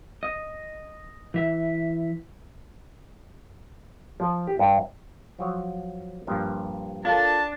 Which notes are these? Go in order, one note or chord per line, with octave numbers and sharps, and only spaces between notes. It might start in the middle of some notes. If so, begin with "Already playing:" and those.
D#5
E3 E5
F3
G4
G2
F3 F#3 C#5
G2 A#2 F3
D4 F4 A4 A#4 A5